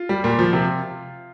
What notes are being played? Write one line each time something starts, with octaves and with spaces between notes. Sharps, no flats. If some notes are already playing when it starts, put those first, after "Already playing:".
Already playing: F4
G3
A#2
F3
C3